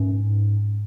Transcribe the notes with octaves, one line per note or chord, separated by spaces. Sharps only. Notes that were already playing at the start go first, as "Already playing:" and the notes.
Already playing: G#2 C#4